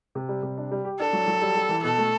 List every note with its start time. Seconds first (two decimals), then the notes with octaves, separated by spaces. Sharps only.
0.15 C3
0.29 G3
0.43 C3
0.57 D4
0.71 G3
0.85 G4
0.99 D4 A4
1.13 F#3
1.28 F#3
1.42 G3
1.56 G3
1.69 E3
1.83 B2 A4
1.98 A3